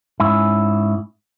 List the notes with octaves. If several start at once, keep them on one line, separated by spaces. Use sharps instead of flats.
G#2 C#4 E4